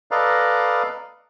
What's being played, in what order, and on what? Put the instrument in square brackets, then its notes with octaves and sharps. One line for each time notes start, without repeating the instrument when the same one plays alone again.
[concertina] A4 B4 D5 D#5 F5 A#5